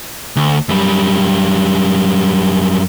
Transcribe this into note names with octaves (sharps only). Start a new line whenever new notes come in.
D2
F#2 G3